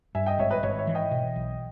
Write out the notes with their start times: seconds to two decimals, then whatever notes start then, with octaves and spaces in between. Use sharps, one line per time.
0.15 G2 E5 G#5
0.26 D#5 G5
0.39 G#1 C#5 E5
0.50 B4 D#5
0.63 G#1 C#5 E5
0.79 C#5 E5
0.87 E3
0.95 D#5 G5
1.11 B2
1.36 B1